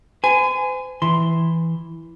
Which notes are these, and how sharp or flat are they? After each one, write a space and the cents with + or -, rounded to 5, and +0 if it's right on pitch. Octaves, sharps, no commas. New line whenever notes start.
C5 -45 G#5 +0
E3 +0 C6 +0